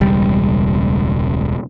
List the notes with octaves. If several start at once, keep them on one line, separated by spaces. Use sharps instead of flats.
E1 C#2 G3